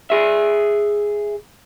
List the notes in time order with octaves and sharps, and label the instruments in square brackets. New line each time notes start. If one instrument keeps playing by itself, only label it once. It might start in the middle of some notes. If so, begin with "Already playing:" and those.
[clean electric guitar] G#4 E5